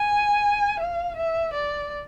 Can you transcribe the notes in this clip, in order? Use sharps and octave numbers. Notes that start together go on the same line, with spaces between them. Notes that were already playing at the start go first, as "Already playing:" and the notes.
Already playing: G#5
F5
E5
D5